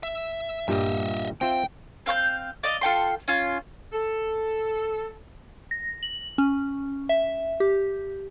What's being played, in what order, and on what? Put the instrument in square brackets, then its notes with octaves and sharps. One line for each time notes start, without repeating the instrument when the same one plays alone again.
[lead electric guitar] E5
[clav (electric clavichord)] G2 A#2 G3 [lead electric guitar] D#5 E5
[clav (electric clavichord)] C4 F4 E5 [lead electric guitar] G5
[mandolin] C4 F5 C6 G6
D5 D#5 F5
F4 A4 G5 C6
C#4 F4
[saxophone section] A4
[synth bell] A#6
F#7
C#4
E5
G4